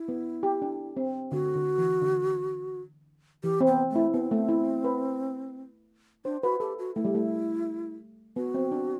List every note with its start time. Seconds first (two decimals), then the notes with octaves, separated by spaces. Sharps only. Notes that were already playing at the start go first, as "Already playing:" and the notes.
Already playing: E4
0.08 B3
0.43 G4
0.62 D4
0.97 C4
1.32 D3 F#4
1.56 D3
1.78 E3
2.02 D3
3.43 E3 G4
3.61 C4
3.67 B3
3.90 A3
3.96 E4
4.14 B3 C4
4.31 A3
4.48 E4
4.84 B4
6.25 D4 C5
6.43 F#4 B4
6.60 G4 A4
6.79 F#4
6.96 A3 E4
7.05 G3
7.15 A3
8.36 B3 F#4
8.54 C4
8.72 D4